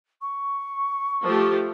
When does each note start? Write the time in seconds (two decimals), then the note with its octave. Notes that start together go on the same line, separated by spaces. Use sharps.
0.21 C#6
1.24 F3 A3 G4